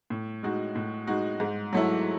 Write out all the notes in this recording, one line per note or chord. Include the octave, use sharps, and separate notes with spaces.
A2
G#3 D#4 F#4
A2
G#3 D#4 F#4
G#2
F#3 A3 E4